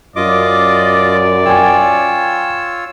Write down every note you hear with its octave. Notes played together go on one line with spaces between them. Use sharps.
F#2 F4 D5 D#5 D6
F4 C#5 G5 G#5 E6